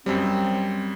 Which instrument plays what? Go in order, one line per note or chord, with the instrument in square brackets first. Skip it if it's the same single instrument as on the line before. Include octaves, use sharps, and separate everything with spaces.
[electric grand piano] F#2 G3 [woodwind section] C4